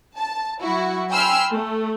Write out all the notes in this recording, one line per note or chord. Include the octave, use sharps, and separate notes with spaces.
A5
F#3 E4 F#4
G5 G#5 B5 C6 E6 F6
A3